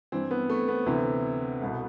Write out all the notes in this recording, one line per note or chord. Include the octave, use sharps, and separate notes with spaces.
G2 E3 C4
B3
A3
B3
D2 C3 E3
C2 B2